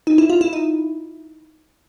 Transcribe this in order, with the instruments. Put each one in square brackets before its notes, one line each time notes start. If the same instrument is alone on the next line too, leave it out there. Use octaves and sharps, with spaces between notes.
[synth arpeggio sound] D#4
E4
F4
E4
D#4